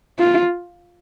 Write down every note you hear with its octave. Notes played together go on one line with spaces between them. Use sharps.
F4